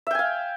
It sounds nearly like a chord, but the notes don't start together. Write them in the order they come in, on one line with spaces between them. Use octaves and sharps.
E5 G5 G#5 F5